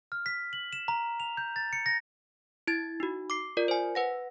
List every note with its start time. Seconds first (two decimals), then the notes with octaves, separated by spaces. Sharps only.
0.12 F6
0.26 B6
0.53 F#7
0.73 E7
0.88 A#5
1.20 F7
1.37 G6
1.56 A6
1.73 C#7
1.86 A#6
2.67 E4 G#6 A6
3.00 D#4 F#4
3.30 D6 C7
3.57 F4 A#4 D5
3.68 C5 G#5
3.95 B4 F#5 A#6